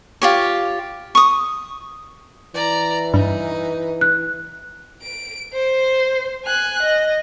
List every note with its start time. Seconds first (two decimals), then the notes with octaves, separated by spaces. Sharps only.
0.22 F4 G4 C#5
1.15 C#6 D#6
2.54 E3 D5 A#5
3.14 G2 D#4
4.01 F#6
5.02 D7
5.53 C5
6.45 G#5 F#6
6.82 D#5